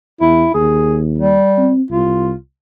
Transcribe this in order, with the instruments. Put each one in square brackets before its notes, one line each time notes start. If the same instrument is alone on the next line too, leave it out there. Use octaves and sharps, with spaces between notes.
[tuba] E2 [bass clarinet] E4
[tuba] D#2 [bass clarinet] G#4
[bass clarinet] G3
[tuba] C4
[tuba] C2 [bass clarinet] F4